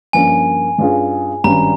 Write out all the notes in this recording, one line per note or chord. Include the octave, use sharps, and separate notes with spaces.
G2 F3 A#3 C#4 G#5
G2 G3 C#4 F4 G#4
G#1 G2 G3 C#4 A#5